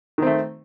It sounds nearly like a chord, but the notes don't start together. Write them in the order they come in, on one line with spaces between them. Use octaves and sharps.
D#3 C4 A3